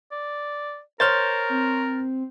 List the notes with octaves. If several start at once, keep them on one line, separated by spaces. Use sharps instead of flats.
D5
A#4 C5 C#5 F6 G6 A6
C4